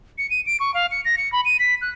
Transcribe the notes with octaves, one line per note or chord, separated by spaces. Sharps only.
C#7
D#7
D7
C#6
F5
C#7
A#6
C#7
B5
D#7
B6
F#6